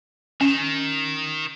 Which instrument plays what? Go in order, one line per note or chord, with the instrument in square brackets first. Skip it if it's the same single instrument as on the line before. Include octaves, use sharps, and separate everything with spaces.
[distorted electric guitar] D#3 [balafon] C#4